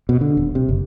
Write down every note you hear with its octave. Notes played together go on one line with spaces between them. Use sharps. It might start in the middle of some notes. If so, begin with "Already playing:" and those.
B2
D3
D#1
C3
F#1